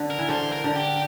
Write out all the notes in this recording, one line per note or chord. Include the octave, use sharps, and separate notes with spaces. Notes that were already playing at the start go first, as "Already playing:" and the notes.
Already playing: D3
A#4
E3
D3 C5
A#4
D3
G4